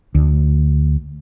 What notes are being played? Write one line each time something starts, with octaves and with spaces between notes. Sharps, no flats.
D2